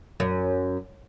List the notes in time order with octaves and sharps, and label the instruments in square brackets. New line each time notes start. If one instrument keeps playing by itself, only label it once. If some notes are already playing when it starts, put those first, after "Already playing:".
[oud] F#2